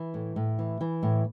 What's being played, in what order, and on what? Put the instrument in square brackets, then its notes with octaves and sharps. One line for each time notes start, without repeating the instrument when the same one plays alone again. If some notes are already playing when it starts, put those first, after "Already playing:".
Already playing: [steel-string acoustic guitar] E3
A2
A2
E3
E3
A2